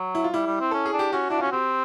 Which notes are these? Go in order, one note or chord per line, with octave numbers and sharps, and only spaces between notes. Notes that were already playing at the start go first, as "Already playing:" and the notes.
Already playing: F#3
E4
F4
G3 E4
G3
C4
C#4 A4
G#4
D4
G4
C#4 F#4
D4 E4
F4
C#4 F#4
C4 G4